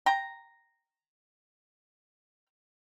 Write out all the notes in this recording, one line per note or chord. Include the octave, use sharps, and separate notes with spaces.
G5 A#5